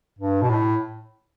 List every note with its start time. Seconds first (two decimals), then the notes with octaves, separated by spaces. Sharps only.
0.19 G2
0.42 B2
0.50 A2